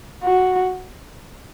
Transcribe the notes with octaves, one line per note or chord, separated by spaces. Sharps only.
F#4